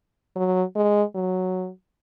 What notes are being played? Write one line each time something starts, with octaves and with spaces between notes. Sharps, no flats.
F#3
G#3
F#3